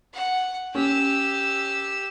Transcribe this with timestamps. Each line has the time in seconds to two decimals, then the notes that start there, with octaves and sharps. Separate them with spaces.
0.14 F#5
0.75 C#4 G4 E6